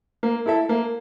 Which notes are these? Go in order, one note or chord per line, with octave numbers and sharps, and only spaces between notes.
A#3
E4 A4 E5
A#3